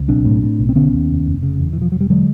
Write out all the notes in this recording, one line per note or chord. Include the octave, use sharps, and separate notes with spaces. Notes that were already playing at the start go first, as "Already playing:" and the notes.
Already playing: C#2
B1 C4 D4
A2
A2
B1
C4
D3 B3 C#4
D#2
F1
F1
C#3
E2
E3
E1
F3
E1 F#3
G3
D3 F#3 G#3